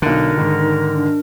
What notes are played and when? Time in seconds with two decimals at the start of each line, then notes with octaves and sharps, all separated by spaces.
0.02 B1 D3 D#4 A#4 F#6
0.37 G#2 D#3
0.93 D4